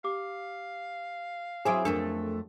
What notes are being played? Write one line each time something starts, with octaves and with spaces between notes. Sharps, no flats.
G4 F5 D6
F#3 C4 E4 G#4 C5 G#5 D6 D7
F2 A3 D4 A4 A#4